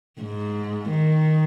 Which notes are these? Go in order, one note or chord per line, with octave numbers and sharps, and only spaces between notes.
G#2
D#3